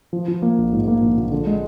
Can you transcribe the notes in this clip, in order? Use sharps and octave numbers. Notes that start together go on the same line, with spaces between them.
F3
F3
A#3
A#1
G#2
A#3
A#1
A#1
D3
G#3